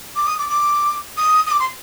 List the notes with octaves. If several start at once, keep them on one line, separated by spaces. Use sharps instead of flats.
D6
D#6
D6
D6
D#6
D#6
D6
C6